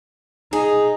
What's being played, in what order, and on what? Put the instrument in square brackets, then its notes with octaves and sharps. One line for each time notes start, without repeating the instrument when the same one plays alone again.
[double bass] D#4 [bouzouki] G#4